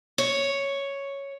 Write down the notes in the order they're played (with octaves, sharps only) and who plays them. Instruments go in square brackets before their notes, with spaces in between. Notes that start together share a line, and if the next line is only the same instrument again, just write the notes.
[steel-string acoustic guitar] C#5